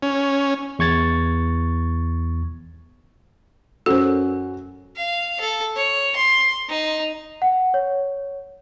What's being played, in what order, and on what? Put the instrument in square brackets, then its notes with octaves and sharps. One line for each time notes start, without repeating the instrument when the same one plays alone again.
[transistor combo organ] C#4
[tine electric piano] E2 C#6 G#6 A6
[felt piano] F#2 C#4 F#4 [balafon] A4 C5
[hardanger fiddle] F5
A4
C#5
C6
D#4
[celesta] F#5
C#5